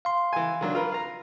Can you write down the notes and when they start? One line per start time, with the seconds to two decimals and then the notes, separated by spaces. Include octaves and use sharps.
0.05 F5 C6
0.33 E3 G#5
0.61 D#3 F#3 D4
0.75 F4 A#4 B4
0.92 F5 A#5